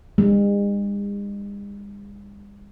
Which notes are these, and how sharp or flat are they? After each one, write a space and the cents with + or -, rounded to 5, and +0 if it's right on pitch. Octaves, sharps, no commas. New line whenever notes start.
G#3 -45